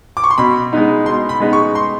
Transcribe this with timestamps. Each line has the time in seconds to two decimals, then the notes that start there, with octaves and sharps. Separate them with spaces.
0.17 D6
0.24 C#6
0.30 C6
0.38 B2 B5
0.73 G#3 B3 D#4
1.06 B2 C6
1.29 B5
1.40 G#3 B3 D#4
1.53 C#6
1.75 C6